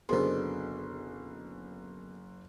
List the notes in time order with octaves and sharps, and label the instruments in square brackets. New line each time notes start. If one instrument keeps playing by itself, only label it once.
[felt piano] F#1 C6 [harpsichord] B2 D3 [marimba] G#4 A#4 C5